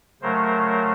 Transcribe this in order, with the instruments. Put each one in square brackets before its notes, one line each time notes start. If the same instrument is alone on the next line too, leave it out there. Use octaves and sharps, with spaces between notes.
[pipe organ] C#3 F#3 A3 A#4 C5